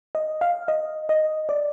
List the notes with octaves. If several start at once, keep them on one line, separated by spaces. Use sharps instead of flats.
D#5
F5
D#5
D#5
D5